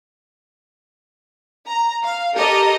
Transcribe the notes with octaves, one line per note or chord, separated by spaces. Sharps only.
A#5
F5
G4 A4 A#4 D#5